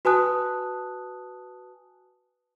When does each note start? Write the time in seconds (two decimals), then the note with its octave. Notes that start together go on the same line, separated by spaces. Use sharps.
0.05 F#4 B4 G#5 A5 D#6 F#6